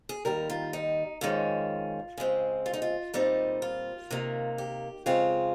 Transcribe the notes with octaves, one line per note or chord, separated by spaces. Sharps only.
G#4
D#2 D#3 G3 A#4
F4
D#4
F2 D#3 G#3 C#4 F4
C#3 G#3 C4
F4
D#4
F4
A#2 G3 C4 D#4
F4
C3 D#3 A#3
G4
F2 C#3 G#3 C4 F4